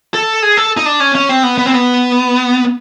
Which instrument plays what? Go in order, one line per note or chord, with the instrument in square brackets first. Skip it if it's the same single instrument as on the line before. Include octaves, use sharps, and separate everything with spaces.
[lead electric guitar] A4
G#4
A4
D#4
D4
C#4
C#4
C4
B3
B3
C4
B3